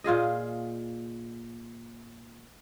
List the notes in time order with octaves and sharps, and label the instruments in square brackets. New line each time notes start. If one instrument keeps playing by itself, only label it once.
[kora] A#2 F4 G#4 D#5